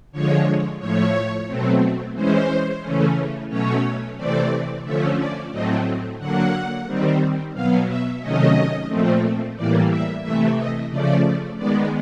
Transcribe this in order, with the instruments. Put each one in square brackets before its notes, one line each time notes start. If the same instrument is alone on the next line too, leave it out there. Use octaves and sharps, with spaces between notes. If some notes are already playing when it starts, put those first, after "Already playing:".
[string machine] D3 F3 G#3 C#5
A2 F3 A3 C#5
B2 F#3 A3 C4
E3 G#3 C#4 C5
C#3 E3 A3 C#4
B2 F#3 A3 C#4 C#5
C3 E3 A3 C4 D5
D3 F3 A3 C#4 E5
D5
A2 F#3 A3 C4 D#5
D3 F#3 A#3 F#5
D#3 G3 C4
B2 F#3 B3 F5
E5
C3 D#3 F#3 A3 C#4 D#5
A#2 F3 A3 C4
A2 E3 G3 A#3 D5
E5
C3 E3 A3 E5
D#5
C#3 F3 A3 D5
D#3 G#3 B3 D5